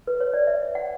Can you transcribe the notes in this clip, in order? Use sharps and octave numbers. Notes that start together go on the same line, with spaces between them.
B4
C#5
D5
E5
F#5